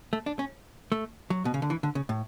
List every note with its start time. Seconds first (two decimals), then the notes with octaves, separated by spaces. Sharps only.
0.13 A3
0.26 D4
0.39 C#4
0.92 A3
1.30 F#3
1.45 B2
1.54 C#3
1.62 D3
1.70 E3
1.83 D3
1.95 C#3
2.09 A2